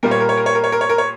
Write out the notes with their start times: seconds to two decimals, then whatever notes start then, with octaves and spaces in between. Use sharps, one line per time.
0.03 A#2 G3 A#3 A#4
0.11 C#5
0.20 A#4
0.29 C#5
0.37 A#4
0.46 C#5
0.55 A#4
0.64 C#5
0.72 A#4
0.81 C#5
0.89 A#4
0.98 C#5